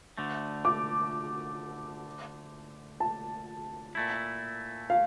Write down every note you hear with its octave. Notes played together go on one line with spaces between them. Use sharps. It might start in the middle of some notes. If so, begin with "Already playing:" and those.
D2 D3 A3
D6
A5
A#2 A3 E4
F5